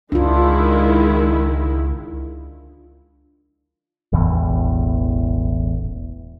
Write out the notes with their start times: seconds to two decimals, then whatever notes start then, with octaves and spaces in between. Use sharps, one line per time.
0.12 C#2 D#3 G#3 D4 E4 F4
4.12 E1 A1 E2